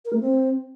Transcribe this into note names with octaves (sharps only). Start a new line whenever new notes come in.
A#4
A3
C4